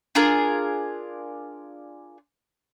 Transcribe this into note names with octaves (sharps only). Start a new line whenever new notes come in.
D4 F4 G#4 A#4